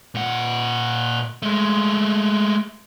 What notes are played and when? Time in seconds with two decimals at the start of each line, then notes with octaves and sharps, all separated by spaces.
0.15 A#2 F#5
1.42 G#3 A3